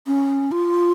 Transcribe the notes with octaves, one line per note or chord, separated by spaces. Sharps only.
C#4
F4